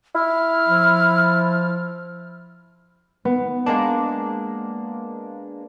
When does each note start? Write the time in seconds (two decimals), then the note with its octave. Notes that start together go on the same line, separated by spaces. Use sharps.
0.15 E4 F6
0.68 F3
3.25 B3
3.66 G#3 A#3 D4